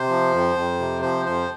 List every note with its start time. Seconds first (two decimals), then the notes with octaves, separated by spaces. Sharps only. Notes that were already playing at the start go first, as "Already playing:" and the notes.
Already playing: C3 C5
0.09 F3
0.32 F2
0.55 F2
0.79 C3
1.02 F3 C5
1.26 F2 C5